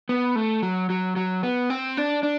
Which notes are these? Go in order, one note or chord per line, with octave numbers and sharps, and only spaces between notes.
B3
A3
F#3
F#3
F#3
B3
C4
D4
D4